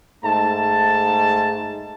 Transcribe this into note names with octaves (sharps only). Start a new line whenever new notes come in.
G#2 A3 A5